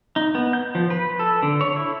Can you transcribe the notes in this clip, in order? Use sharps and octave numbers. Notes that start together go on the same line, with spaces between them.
D#4
B3
G6
F3
B4
A4
D3
C#5
E4